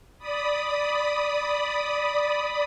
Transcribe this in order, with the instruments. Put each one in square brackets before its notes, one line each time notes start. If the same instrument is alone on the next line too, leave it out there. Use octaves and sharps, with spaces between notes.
[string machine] D5 B5 D#6